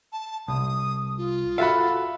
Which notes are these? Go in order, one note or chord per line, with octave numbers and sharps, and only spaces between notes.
A5
C2 D#6
F4
F#4 A4 E5 F5 B5